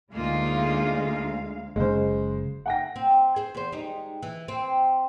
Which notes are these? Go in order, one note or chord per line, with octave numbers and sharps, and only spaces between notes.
D2 G#3 A#3 D#4 F4 F5
F#1 C#3 G#3 C5
F#5 G5 A#6
C4
G#4 C5
E2 C5
G3 G#3 D#4
E3
C4